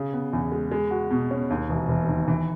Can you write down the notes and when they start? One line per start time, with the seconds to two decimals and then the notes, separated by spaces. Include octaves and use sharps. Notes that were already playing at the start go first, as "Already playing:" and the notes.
Already playing: C#3
0.13 B3
0.33 E2
0.52 G#3
0.72 G#3
0.91 F#4
1.11 B2
1.31 C#4
1.50 D#2
1.69 E1
1.89 E1
2.09 D#3
2.28 E3